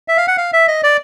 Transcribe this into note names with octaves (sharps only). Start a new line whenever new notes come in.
E5
F5
F#5
F5
E5
D#5
D5